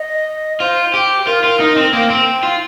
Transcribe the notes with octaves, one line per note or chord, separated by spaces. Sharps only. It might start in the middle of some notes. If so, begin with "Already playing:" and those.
Already playing: D#5
F4 C5
G4
F4 A#4
F4
D#4
C4
A#3 G5
C4
F4